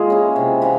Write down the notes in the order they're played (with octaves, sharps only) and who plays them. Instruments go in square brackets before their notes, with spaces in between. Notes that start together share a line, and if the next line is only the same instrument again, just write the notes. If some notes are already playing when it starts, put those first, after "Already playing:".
Already playing: [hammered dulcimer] G#3 A#3 [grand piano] F4 G#4
[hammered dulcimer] C#4 E4
C3
E3 A#3